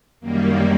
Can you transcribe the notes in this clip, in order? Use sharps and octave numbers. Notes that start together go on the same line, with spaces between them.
F#2 D#3 G3 A#3